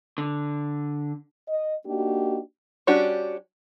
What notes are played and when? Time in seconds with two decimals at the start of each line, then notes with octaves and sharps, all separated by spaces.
0.18 D3
1.49 D#5
1.87 A#3 D4 D#4 F#4 G4
2.87 G3 C#4 D4 F#4 G4